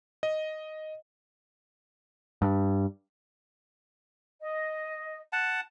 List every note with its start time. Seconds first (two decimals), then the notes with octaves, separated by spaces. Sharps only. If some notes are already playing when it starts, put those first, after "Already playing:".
0.23 D#5
2.42 G2
4.41 D#5
5.33 F#5 A5